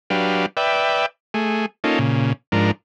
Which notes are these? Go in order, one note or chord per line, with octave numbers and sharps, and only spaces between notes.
F#3 D4 G4 B4 F5
B4 D5 E5 G5
A3 G#4
A#3 C#4 D#4 F4 A4
A#2 C#3
G#2 F3 D4 A#4